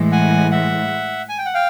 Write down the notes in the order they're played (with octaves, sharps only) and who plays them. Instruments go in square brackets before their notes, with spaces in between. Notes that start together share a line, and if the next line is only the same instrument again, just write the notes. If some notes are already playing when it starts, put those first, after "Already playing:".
Already playing: [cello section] A2 E3 G#3
[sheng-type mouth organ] F#5 G#5
E5 F#5
G#5
G5
F#5
F5 G5